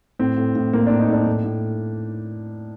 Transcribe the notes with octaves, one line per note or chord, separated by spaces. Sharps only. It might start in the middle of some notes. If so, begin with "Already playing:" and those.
A2 C4
A2
A2
A2 A#3
D4
A2
D#4
A2 D4
A2
A2